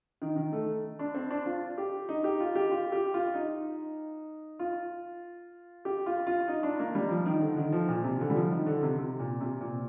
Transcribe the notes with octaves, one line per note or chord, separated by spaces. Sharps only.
D#3
D#3
A3
D4
C4
D4
F4
G4
D#4
G4
F4
G4
F4
G4
F4
D#4
F4
G4
F4
F4
D#4
D4
A#3
G3
F3
D#3
D3
D3
D#3
F3
A#2
C3
D3
G3
F3
D#3
D3
C3
C3
A#2
C3
A#2